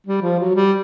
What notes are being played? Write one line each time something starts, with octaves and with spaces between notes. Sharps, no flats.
G3
F3
F#3
G3